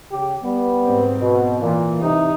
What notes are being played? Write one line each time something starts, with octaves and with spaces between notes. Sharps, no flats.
C#3 G4
G3 B3
G#2 C4
B2
A#2 E3
C2 C3 D#4